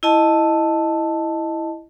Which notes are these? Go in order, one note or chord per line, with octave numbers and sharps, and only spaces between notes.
E4 D#5 A5